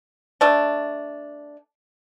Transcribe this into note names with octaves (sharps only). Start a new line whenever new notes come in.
A3 D4